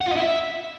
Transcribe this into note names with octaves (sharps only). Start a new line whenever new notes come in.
F#5
F4
D#5
E4
E5